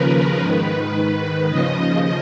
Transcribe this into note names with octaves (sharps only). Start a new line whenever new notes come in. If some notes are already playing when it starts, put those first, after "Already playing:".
Already playing: D#2 C#3 F3 A#4 B4
G#2 D#3 B4
D#2 C#3 F3 D#5